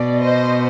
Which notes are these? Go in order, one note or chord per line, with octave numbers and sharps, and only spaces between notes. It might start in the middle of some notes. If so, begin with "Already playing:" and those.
Already playing: B2 D5
C5 D#5